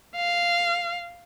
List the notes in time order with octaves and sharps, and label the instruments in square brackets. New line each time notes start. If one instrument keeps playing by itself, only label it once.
[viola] F5